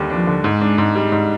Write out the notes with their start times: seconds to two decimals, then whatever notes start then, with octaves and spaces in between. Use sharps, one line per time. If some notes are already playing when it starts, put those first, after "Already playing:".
Already playing: D#2 D3 G3
0.10 F3 D4
0.27 D3
0.44 G#2 G#3
0.61 D4
0.78 G#2
0.95 G3
1.12 G#2